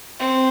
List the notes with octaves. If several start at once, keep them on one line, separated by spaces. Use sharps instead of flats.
C4